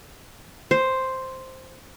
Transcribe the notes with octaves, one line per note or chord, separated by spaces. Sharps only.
C5